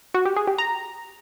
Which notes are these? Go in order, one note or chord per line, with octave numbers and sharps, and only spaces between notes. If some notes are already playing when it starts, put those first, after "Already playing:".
F#4
G4
G#4
G4
A#5